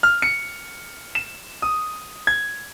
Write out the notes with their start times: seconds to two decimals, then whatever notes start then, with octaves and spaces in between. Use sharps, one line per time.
0.03 F6
0.22 C#7
1.15 E7
1.62 D#6
2.27 G#6